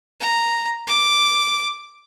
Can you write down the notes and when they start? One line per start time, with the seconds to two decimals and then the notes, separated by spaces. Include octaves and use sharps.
0.20 A#5
0.87 D6